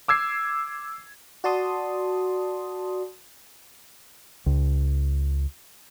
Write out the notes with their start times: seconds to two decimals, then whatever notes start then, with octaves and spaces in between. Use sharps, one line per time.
0.08 D6 E6 G#6 C7
1.44 F#4 D5 A5 C6 D#6
4.46 C#2